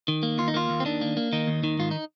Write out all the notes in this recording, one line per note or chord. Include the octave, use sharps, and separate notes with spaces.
D#3
A#3
D#2 F4
D#4
A#3 F4
D#2
C4
D#3 D4
A#3
A#3
D#3 D#4
D#2
D#3
G#2 F4
D#4